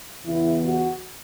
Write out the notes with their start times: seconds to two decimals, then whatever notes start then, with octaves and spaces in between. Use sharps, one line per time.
0.25 E2 C#3 E3 B3 E4
0.62 F#4